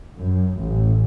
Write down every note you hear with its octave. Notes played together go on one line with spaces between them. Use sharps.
F#2
A1